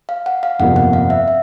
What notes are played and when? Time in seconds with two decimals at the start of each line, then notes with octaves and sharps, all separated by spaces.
0.09 F5
0.26 F#5
0.43 F5
0.59 G1 F2 C3 F3 A#3 F#5
0.76 F#5
0.93 F5
1.10 E5
1.28 E5